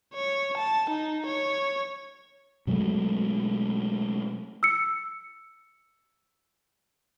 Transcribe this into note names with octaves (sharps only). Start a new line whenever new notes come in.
C#5
A5
D#4
C#5
B2 F#3 G#3 A3
E6 C#7